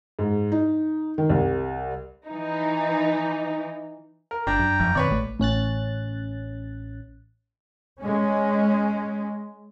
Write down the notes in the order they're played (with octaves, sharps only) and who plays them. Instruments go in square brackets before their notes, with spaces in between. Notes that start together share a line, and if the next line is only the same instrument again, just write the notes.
[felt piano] G#2
D#4
D#3
C2
[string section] E3 D#4
[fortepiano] A#4
[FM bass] G1 [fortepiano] D4 [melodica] G5 A#5
[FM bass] F#2
[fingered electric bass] E1 F3 [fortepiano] A1
[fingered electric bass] B2 D#3 C4 [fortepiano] B4 C#5 D5
[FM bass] A1 [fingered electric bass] A3
[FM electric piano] A1 C#4 F#6 A6
[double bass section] G#3 C#4